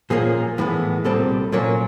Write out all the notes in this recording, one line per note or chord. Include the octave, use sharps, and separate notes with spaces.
A#2 F3 A#3 C#4 G#4
A2 E3 G#3 B3
C2 A#2 G3 C4 A4
A#2 F#3 A#3 C#4